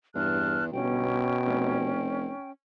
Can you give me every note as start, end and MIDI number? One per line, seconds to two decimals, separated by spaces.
0.15 0.70 40
0.15 0.62 43
0.15 0.65 81
0.15 0.65 89
0.15 0.65 90
0.72 1.21 31
0.72 2.12 47
0.72 2.51 61
0.72 2.51 79
1.47 2.30 29